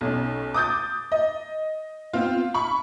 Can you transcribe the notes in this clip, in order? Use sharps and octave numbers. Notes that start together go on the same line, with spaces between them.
B1 C#4
D6 D#6 G6 A6
D#5
B3 C4 F4
B5 C#6